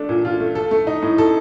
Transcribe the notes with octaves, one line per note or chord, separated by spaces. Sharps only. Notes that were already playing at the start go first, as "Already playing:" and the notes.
Already playing: A3 D4
A#2
F4
A3
A4
A3
D#4
A2
A4